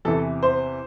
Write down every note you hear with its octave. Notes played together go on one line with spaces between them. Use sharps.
E2 C3 E3 A4
C5